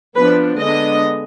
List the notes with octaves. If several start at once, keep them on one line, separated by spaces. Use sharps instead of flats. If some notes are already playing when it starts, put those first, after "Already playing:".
F3 B3 D4 B4
D3 G#3 B3 D4 D#5